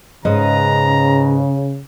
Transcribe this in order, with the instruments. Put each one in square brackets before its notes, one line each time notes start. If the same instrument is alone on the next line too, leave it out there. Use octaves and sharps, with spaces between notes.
[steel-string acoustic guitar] G#2 B4 D#5 [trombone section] C#3 [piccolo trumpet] A#5